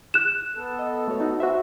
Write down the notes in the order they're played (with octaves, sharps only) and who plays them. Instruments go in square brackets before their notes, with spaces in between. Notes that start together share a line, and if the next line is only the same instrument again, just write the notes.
[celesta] F#6 E7
[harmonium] B3 A4
[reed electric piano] D#5
A3 F#4 C#5
D#4 F#4
F#4 C5 E5